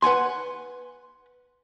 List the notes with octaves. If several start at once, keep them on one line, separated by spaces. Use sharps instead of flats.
B4 F#5 G#5 C6